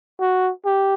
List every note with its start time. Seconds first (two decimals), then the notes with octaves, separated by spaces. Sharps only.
0.20 F#4
0.65 G4